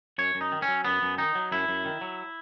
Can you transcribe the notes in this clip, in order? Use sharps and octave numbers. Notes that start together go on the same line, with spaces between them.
F#2 C#5
F#2
D#4
D#3
C#4
F#3
F#2 B3
F#2
D#3 D#4
F#3
F#2 E4
F#2
D#3
F#3